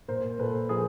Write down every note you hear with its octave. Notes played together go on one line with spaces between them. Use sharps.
A#2 A#4 C5
A#2 A4 B4
F3 G#4 A#4